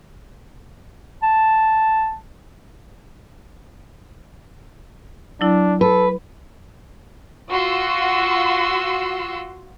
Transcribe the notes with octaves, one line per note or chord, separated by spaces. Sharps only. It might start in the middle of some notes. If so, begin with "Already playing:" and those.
A5
F#3 D4 E4
A4 B4
F4 F#4 C6 E6